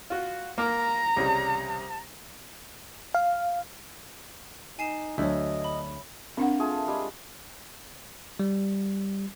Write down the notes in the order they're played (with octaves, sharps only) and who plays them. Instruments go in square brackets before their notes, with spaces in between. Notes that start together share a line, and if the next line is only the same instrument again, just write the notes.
[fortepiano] F4 F#4
[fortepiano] A#3 A#4 F6 [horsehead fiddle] A#5
[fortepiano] C2 C#3 G3
[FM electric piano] F5
[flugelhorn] D#4 [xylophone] G#5 C7 E7
[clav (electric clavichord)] D2 [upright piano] F#3 D4 E6 [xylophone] C#5 E5 [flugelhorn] D#5
[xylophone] B5
[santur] A#3 [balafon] C4 D4 F#5
[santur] A3 F4 G#4
G3 G#3 G#5
[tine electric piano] G3